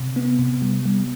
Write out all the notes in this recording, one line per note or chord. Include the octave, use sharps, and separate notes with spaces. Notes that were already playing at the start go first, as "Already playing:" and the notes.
Already playing: C3
B3
C3
G3
G3